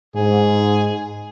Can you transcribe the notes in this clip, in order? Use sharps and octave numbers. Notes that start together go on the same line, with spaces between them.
G#2 G#4